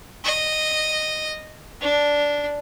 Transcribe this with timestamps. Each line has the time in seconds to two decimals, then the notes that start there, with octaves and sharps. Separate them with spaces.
0.24 D#5
1.81 D4